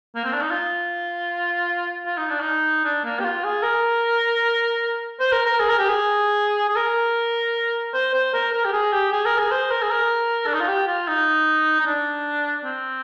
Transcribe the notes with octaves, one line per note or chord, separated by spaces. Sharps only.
A#3
C4
D4
D#4
F4
F4
D#4
D4
D#4
D4
A#3
G4
F4
G#4
A#4
C5
A#4
A#4
G#4
A#4
G4
G#4
G#4
A#4
C5
C5
A#4
A#4
G4
G#4
G4
G#4
A#4
G#4
C5
A#4
G#4
A#4
D4
D#4
F4
G4
F4
D#4
D#4
D4
C4